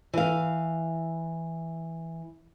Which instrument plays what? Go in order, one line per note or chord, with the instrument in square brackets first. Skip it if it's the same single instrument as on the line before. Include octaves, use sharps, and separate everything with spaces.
[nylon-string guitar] E3 F5